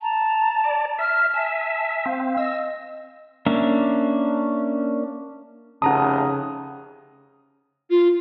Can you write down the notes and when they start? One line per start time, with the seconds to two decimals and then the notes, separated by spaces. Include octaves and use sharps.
0.01 A5 A#5
0.64 D5
0.99 E5 F6
1.34 E5 G#5 A5
2.06 C4 F5
2.37 D#5 E6
3.46 A#3 C#4 D4 E5
5.82 F1 C#3 D#4 F#5 A5 A#5 D#6
7.90 F4